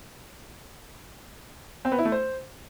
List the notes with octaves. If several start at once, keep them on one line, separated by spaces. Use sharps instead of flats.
C4
B3
E4
A3
C5